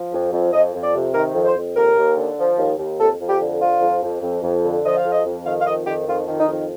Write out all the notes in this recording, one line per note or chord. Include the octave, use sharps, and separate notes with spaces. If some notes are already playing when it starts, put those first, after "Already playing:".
Already playing: F3
F2
F2
F2 D#5
F2
D5
C3
D#3 A#4
F2
C5
F2
D#2 A#4
D#2
D3
F3
D#2
D#2
F2 A4
F2
G4
D3
F3 F4
F2
F2
F2
F2
D3
F3 D#5
F5
F2
D#5
F2
D#3 F5
F5
F2 D#5
D#3 G4
F2 F4
D#3
D#4
F2